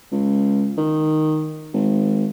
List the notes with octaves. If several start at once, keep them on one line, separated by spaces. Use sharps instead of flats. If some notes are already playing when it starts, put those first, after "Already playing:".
C#2
D#3
G#1